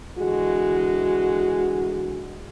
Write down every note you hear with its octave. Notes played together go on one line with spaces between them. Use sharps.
D3 E3 G#3 F#4